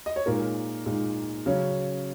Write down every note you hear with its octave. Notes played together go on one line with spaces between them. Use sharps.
D#5
C#5
A#2 G#3 D#4 A#4
A#2 G#3 D#4
C#3 F#3 C#4